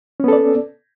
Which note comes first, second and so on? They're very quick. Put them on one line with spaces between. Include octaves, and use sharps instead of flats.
C#4 B3 A4 D5